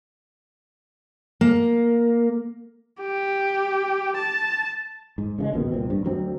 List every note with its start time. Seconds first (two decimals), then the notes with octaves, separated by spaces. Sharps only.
1.41 A#3
3.02 G4
4.17 A5
5.18 G#2
5.38 C#3 E3 G#3
5.53 A#1 D#2 B2 D#3
5.72 C2 A#2 C4
5.90 G2
6.05 D2 F#3 C4